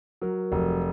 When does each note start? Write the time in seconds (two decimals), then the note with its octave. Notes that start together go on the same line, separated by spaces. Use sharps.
0.22 F#3 A#4
0.52 F1